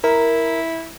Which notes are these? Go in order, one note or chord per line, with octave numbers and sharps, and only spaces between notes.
E4 A#4